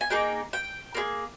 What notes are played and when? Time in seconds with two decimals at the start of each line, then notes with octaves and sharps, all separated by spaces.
0.01 G#5
0.10 A#3 D#4 G#4 G5
0.53 G5
0.95 A#3 D#4 G#4